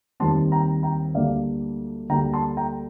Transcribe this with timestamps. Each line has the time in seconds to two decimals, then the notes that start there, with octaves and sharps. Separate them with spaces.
0.20 D#2 D#3 G3 C4 A5 C6
0.52 G5 A#5
0.83 G5 A#5
1.14 D2 D3 G3 A#3 D4 D5 F5
2.09 D2 D3 G3 A#3 D4 G5 A#5
2.33 A5 C6
2.57 G5 A#5